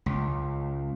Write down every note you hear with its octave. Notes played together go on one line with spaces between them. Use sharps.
C#2